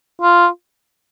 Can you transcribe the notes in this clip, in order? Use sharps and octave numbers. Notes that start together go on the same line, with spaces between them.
F4